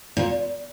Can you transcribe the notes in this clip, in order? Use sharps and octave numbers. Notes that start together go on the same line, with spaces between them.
A#2